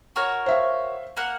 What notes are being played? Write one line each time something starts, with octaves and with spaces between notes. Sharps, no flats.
F#4 A#4 C#5
C5 E5 F5
A#3 A#4 F#5